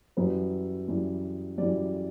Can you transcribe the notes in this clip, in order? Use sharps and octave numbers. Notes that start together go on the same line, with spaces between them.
F#2 E3 G3 B4
F#2 E3 G3
F#2 E3 G3 D5